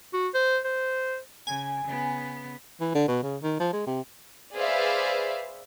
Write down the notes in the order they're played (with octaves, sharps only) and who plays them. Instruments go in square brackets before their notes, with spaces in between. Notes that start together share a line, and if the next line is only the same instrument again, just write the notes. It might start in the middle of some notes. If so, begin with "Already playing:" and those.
[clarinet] F#4
C5
C5
[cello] C#3 [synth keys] G#5
[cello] C#3 B3
[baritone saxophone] E3
D3
B2
C#3
D#3
F3
G#3
C3
[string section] G#4 B4 C5 D5 E5 F5